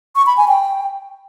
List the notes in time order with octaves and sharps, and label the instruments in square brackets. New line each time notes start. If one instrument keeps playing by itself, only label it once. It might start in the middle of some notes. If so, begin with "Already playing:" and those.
[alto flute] C#6
B5
G#5
G5